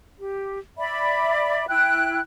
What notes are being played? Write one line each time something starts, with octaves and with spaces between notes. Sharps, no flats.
G4
D5 E5 B5
E4 G5 F#6